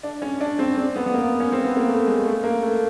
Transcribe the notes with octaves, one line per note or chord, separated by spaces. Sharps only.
D4
C#4
D4
C4
C4
B3
B3
A#3
C#4
C4
B3
A#3
A3
G#3
A3
A#3
A3